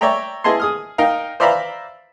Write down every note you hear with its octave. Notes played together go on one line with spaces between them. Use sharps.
C#5 D5 E5 G5 A#5
E4 G#4 D#5 G#5 A5 C6
G#4 D#6 F6
D#4 A#4 F5 G5
C5 D5 E5 F5 A#5 B5